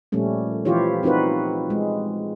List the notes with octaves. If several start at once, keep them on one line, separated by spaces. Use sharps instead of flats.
A#2 F3 G3 A3 C#4
E3 F3 E4 F4 G4 C#5
C4 D#4 F4 F#4 B4
G#3